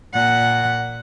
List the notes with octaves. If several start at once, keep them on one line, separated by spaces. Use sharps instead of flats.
A#2 F#5